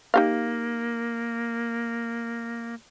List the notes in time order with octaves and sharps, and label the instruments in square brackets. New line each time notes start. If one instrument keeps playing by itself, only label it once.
[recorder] A#3 [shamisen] D#4 G4 F5